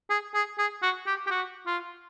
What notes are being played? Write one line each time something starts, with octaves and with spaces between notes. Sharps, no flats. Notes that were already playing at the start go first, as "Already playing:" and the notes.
G#4
G#4
G#4
F#4
G4
G4
F#4
F4